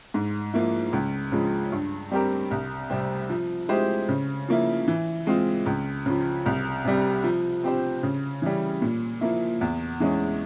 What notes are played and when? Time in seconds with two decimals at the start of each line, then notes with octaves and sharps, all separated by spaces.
0.14 G#2
0.53 F3 A#3 E4
0.93 C#2
1.32 C#3 F3 G#3
1.72 G2
2.11 G3 C4 G4 A#4
2.51 C2
2.90 C3 G3 C4
3.30 F3
3.69 G#3 E4 G4 C5
4.09 C#3
4.48 F3 A#3 E4
4.88 E3
5.27 G#3 C4 F4
5.66 C#2
6.06 C#3 F3
6.46 C2
6.85 C3 G3
7.24 F3
7.64 C4 G4 C5
8.03 C#3
8.42 E3 G3
8.82 A#2
9.21 F3 A#3 E4
9.61 E2
10.00 E3 G#3 C#4